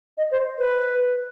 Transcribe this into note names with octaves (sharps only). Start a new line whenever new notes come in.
D#5
C5
B4